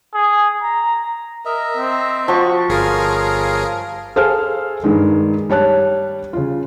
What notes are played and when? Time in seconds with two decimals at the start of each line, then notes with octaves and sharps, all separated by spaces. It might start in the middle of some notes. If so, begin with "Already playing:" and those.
0.14 G#4
0.62 A#5
1.45 A#4 D#5 E5 A#5
1.77 C4
2.28 F3 F#4 C#6
2.68 G1 G#4 A#4 C#5 F5 C6
4.16 G#4 A4 C5 F5 G#5 F6
4.84 G2 D#3 G#3
5.49 G3 C#5 A5 F#6
6.33 C#3 F4